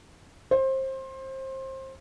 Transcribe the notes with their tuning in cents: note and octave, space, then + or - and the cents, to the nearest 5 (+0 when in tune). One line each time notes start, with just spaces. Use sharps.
C5 +25